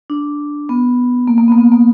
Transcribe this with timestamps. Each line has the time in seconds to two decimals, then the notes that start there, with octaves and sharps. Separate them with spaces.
0.10 D4
0.69 B3
1.28 A#3
1.38 A#3
1.48 B3
1.52 A#3
1.58 B3
1.72 A#3